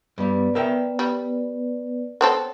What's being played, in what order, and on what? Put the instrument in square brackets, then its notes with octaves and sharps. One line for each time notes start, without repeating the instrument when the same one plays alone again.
[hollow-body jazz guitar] G2 G3 [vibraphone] B3 B4 D5
[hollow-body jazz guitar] A#4 E5 G5
[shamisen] G3
[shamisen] B3 C4 A4 [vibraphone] C#5